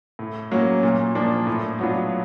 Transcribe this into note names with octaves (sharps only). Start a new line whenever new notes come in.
A2
F#3 A#3 C#4
A#2
F3 A#3 D4
A2
F#3 B3 D4 F4